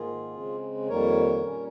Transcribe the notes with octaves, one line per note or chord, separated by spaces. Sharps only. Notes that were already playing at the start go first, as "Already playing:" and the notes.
Already playing: G#2 D#3 A#3 F4 G#4
C#3 G#3 C4
F2 D#3 G3 A#3 A#4 C#5
A#2 G3 C#4